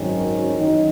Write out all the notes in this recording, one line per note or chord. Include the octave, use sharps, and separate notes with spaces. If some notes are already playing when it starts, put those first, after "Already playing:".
Already playing: G#1 F#2 D#3 F#3 C#4
E2 D#3 F#3 D#4